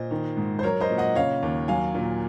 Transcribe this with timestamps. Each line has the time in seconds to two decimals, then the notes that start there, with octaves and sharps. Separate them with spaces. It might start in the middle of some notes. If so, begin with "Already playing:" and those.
Already playing: A#2 C5 D#5
0.11 D#3
0.37 G#2
0.59 C5
0.63 F#3 A#4 C#5
0.81 C5 D#5
0.90 A#2
0.98 D#5 F#5
1.15 C#3 C#5 F5
1.43 D#2
1.68 F#3 F5 G#5
1.95 A#2